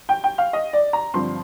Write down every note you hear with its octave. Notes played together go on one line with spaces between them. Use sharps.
G5
G5
F5
D#5
D5
A#5
G2 D3 F3 C4 C6